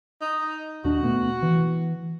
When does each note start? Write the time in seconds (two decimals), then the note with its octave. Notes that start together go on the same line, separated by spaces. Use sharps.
0.22 D#4
0.84 D#2 D4 F#4
1.02 B2 A3 B3
1.42 E3